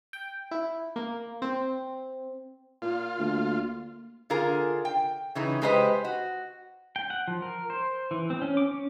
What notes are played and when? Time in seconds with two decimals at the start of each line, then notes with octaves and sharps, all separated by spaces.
0.13 G5
0.51 E4
0.96 A#3
1.42 C4
2.82 A#2 F4
3.19 D2 A#3
4.30 D3 F4 G#4 A#4
4.85 G5
5.35 C#3 E3 D#4
5.62 G#3 G4 B4 C5 D#5
6.04 F#4
6.96 G5
7.10 F#5
7.28 F3
7.42 A#4
7.70 C5
8.11 E3
8.30 C4
8.42 C#4
8.57 D6
8.71 C#4